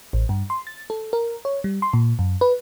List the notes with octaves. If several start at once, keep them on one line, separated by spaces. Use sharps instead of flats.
A1
G2
C6
A6
A4
A#4
C#5
G3
C6
A#2
F#2
B4